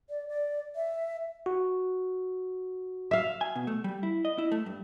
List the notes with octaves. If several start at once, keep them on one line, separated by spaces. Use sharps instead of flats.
D5
D5
E5
F#4
E5 F5
G#5
B2
A3
G3
E4
D#5
E4
A3
G2